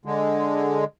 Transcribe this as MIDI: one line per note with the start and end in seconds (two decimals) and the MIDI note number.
0.06 0.84 50
0.06 0.84 56